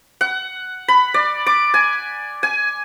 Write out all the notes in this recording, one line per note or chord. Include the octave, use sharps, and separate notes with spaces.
F#5
B5
D5
D6
G#5
G#5